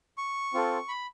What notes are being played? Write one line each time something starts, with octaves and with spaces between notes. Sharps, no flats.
C#6
C4 F4 A4
B5